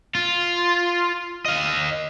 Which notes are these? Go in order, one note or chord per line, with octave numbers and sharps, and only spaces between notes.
F4
D#5 F5